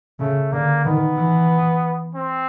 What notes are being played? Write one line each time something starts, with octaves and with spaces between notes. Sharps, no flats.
C#3 A3
D3 A#3
D#3 B3
E3
C4